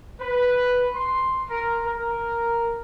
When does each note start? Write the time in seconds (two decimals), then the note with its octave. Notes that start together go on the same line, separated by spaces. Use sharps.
0.20 B4
0.94 C6
1.50 A#4
1.86 A#4